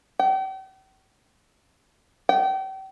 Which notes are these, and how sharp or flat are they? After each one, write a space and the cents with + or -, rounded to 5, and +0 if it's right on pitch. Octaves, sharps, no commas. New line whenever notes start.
G5 -40
G5 -35